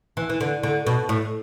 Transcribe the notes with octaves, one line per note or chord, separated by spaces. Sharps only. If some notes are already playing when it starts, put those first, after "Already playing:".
E3
E3
D3
D3
B2
A2